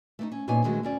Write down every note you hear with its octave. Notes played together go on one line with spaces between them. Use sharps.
A3 A#3 D#4
C#4
D2 A#2 B3 D#4 C#5 G#5
D3 D#3 F#3 G#3 A3 F#4
D2 C#4 D5